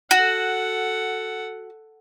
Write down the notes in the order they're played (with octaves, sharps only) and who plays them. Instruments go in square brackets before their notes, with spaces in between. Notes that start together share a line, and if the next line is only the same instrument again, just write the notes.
[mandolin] F#4 [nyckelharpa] A4 F#5